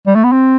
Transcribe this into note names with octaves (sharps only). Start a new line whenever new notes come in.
G3
A3
B3
C4